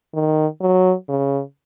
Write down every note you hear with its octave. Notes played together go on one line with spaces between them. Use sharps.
D#3
F#3
C#3